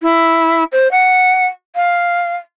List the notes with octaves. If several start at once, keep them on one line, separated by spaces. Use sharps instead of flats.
E4
C5
F#5
F5